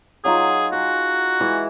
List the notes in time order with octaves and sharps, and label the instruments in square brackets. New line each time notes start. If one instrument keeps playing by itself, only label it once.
[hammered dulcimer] F#3 D#4 F4 [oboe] G#4
[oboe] F#4 [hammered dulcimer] G#4
[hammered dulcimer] E3 G#3 E4